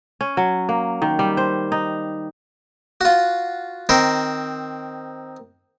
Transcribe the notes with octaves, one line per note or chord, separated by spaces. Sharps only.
C#4
F#3
A#3
D#3
G3
C5
D#4
F4 F#4
D#3 C4 A#4 C5